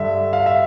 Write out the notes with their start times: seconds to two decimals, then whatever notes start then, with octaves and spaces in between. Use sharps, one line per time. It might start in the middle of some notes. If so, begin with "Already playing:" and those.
Already playing: G2 D3 E5
0.33 F5
0.46 E5